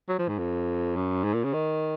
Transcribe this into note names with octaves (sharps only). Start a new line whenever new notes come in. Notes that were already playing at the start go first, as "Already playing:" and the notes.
F#3
F3
G#2
F2
F#2
G#2
A#2
C#3
D#3